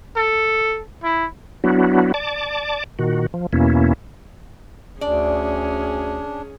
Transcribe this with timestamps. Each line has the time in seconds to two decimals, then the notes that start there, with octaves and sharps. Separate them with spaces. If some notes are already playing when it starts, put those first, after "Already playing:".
0.16 A4
1.03 E4
1.64 F#3 B3 D4 E4 F#4
2.14 D5 A5 D6
2.99 A#2 D#3 F#4
3.34 F3
3.53 E2 B2 A#3 C#4 E4
5.01 D2 C#4 D4 G#4 D5